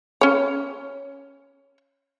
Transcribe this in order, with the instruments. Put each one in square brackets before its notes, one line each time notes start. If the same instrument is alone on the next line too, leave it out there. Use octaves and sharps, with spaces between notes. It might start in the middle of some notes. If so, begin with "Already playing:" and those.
[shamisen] C#4 C#5